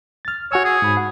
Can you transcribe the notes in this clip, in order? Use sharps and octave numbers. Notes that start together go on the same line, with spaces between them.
F6 A6
F#4 C#5 G#5 E6
G#4
G#2 B5
F#5